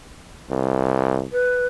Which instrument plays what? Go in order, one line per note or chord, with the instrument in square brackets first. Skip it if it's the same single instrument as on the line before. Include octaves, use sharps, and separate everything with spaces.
[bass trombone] C2
[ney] B4